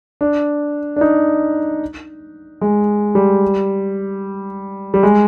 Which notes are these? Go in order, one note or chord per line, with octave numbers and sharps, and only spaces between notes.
D4
D4
D#4
G#3
G3
G3
G#3